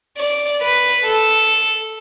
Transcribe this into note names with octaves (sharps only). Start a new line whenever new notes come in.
D5
B4
A4